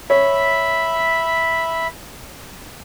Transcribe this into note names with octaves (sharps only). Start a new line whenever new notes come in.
C#5 E5 B5